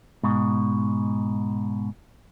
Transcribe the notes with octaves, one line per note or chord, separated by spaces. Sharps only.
G#2 B2